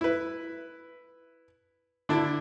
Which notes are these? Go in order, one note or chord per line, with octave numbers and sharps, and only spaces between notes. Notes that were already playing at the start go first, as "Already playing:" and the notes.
E4 B4
D3 D4 E4